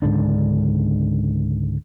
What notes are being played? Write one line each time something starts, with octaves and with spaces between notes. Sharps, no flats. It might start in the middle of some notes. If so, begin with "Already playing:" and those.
C#2 G#2 D3 D4